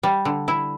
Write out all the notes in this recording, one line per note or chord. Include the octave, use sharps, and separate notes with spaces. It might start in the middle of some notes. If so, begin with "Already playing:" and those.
G3
D3
E4